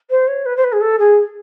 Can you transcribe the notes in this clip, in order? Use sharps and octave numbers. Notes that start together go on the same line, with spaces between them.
C5
C#5
B4
C5
B4
G#4
A4
G#4